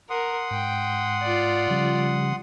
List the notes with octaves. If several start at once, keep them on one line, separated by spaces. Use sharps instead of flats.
A#4 F#5 C6 D#6
G#2 G5
F4 D5
C#3 F3 G3